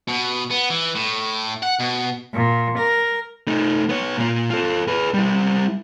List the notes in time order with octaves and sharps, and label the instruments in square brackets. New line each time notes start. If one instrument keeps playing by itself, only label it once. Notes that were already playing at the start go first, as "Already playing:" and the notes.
[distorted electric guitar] B2
B3
E3
A2
F#5
B2
[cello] A#2
A#4
[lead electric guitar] A3 D#4
B3 C#5
A#2 F4
F4 A4
G#4 B4
G3 E4